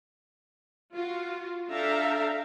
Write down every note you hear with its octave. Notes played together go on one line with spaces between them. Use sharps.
F4 F#4
D4 A4 E5 F5 G5 A#5